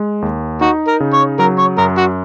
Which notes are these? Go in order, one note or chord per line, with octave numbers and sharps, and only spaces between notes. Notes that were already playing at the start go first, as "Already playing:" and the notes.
Already playing: G#3
D#2
D#4 F#4
A#4
C#3
C#5
F#3 A#4
C#5
F#2 A#4
F#4